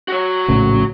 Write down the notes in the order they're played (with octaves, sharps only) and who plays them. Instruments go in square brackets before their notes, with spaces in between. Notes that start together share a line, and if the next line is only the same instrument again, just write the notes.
[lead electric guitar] F#4 C#5
[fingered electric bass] A#1 A2 C#3